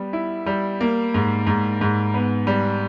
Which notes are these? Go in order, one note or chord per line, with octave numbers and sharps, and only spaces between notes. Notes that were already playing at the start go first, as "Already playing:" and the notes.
Already playing: G3 B3
E4
G3
A#3
G#2
G#2
G#2
B3
G3